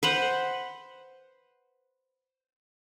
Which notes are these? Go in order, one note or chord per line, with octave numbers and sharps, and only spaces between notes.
B4 C5 F#5